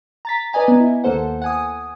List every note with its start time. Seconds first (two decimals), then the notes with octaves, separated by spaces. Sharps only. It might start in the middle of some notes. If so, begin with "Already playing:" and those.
0.25 A#5 A6 B6
0.53 B4 D5 D#5 G#5 A#5
0.68 B3
0.80 E4
1.04 D#2 A#3 A4 C5 F#5
1.42 F#5 G#5 D#6